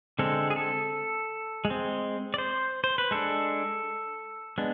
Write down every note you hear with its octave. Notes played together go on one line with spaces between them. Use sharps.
D3 G#3 C4 A4
G#4
A4
G#3
C4
D5
C5
C5
B4
G#3 D4 A4
G#3 B3 D4